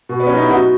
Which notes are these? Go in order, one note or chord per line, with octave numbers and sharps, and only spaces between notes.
B2
B3
F#3 C#4
D#4
E4
B2 D#4 F#4